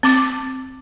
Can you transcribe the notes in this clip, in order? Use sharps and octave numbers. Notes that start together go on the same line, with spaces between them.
C4 D6